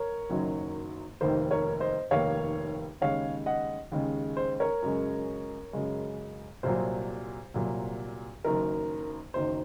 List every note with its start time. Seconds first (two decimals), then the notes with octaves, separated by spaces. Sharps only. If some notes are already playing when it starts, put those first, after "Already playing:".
Already playing: A#4 C#5
0.30 F#1 F#2 D#3 F#3
1.21 F1 D#2 D#3 A#3 C5
1.51 A#4 C#5
1.80 C5 D#5
2.11 F1 D#2 D#3 A#3 C#5 F5
3.01 D#2 C#3 G#3 C#5 F5
3.46 D#5 F#5
3.92 D#2 C#3 G#3
4.37 C5
4.60 A#4 C#5
4.82 F#2 C#3 G#3
5.73 F#2 C#3 G#3
6.63 C2 A#2 F#3 C5
7.54 C2 A#2 F#3
8.44 F#1 F#2 D#3 A#4
9.34 F#1 F#2 D#3 C5